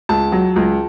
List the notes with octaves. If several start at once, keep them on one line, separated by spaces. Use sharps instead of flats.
C#2 A5
F#3
C#2